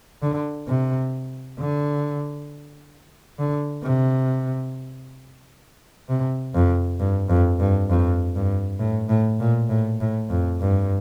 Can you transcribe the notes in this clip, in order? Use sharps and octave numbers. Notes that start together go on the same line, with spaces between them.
D3
C3
D3
D3
C3
C3
F2
G2
F2
G2
F2
G2
A2
A2
A#2
A2
A2
F2
G2